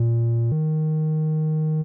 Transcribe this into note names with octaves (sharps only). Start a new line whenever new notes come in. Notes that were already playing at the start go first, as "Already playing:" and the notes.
Already playing: A#2
D#3